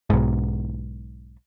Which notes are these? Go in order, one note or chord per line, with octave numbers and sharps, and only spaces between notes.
B1 G#2